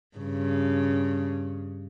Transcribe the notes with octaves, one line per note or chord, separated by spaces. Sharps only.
G2 C#3